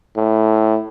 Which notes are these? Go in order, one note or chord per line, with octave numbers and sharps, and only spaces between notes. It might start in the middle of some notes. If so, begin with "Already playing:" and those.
A2